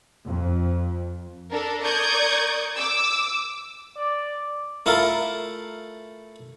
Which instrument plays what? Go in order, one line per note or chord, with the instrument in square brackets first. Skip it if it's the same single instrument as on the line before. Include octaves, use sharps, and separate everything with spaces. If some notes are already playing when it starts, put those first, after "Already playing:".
[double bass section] F2
[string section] D4 A4 A#4
A#4 D5 C#6 D#6 G6 G#6
D6 E6
[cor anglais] D5
[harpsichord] A3 E4 F4 A4 A#4 F5